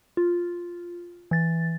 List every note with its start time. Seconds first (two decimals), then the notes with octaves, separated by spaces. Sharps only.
0.17 F4
1.31 E3 A6